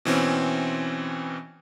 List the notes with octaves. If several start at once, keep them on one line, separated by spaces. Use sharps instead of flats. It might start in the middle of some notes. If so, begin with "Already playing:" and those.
B2 E3 C4 C#4